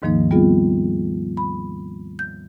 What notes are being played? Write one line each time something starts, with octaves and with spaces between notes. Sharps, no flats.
D#2 G#2 D#3 F3 A#3 D#4
G3 B3 C4 F4 G#4
B5
G6